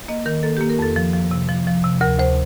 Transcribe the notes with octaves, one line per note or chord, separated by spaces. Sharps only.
A#3 D#5
D#3 A#4
A#3 A4
A#3 G4
A#4
F2 A4
F3
F3
C3
F3
F3
C3
D2 A#4
D2 C5